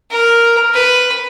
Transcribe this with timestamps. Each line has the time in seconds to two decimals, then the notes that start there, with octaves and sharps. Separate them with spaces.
0.11 A#4
0.74 B4